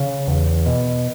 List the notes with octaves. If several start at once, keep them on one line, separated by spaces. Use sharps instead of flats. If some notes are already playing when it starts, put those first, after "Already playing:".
Already playing: C#3
E2
B2